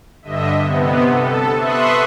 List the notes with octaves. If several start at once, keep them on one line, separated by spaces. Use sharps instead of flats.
G2 D3 D#5 E5
C3 B3
A4
B4 E5 C6 C#6 D#6 F#6